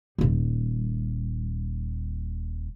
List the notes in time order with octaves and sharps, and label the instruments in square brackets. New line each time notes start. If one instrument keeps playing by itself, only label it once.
[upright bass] D#1 G3